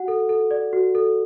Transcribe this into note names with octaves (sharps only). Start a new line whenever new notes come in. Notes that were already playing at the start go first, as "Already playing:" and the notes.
Already playing: F#4 F#5
A4
A4
D5
F#4
A4